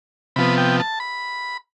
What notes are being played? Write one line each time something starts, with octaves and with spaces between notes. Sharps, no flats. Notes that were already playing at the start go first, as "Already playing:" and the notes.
C3 F3 B3 B5
G5
A5
B5